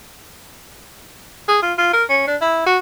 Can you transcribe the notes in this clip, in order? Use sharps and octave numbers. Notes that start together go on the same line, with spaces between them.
G#4
F4
F4
A#4
C#4
D4
E4
F#4